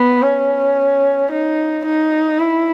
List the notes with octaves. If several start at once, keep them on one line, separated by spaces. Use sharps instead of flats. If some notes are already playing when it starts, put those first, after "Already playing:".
Already playing: B3
C#4
D#4
D#4
E4